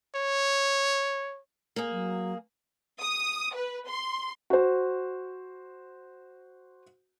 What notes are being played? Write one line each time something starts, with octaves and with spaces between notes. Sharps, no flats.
C#5
A#3 G#4
F#3
D#6
B4
C6
F#4 C5